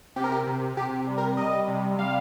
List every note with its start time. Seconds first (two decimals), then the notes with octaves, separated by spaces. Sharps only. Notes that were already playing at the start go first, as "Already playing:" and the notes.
0.16 C3 G4
0.24 A#4
0.32 G4
0.47 C3
0.77 C3 G4
1.07 G3
1.18 A#4
1.37 G3 D#5
1.68 C3
1.99 G3 F5